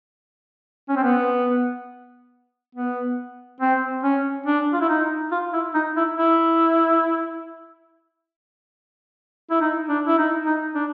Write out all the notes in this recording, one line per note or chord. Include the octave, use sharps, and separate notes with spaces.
C#4
C4
B3
B3
C4
C#4
D4
F4
E4
D#4
F4
E4
D#4
E4
E4
E4
D#4
D4
E4
D#4
D#4
D4